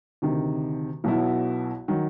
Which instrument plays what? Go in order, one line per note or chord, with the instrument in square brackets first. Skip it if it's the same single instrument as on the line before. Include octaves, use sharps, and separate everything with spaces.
[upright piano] D2 C3 D#3
B1 B2 F#3 B3 E4
D#3 F#3